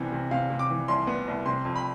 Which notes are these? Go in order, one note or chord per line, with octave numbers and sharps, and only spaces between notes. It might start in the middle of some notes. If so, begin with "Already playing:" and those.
Already playing: C2 C3 E3 B3
C3
C3 F5
C3
D6
E3
C2 C6
B3
C2
C3 C6
F2
B5